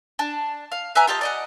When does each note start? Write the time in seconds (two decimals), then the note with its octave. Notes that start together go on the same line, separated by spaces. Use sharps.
0.19 D4 A5
0.72 F5
0.95 B4 E5 G#5 A#5
1.07 F4 G4 D#5 A5
1.21 D5 D#5 F#5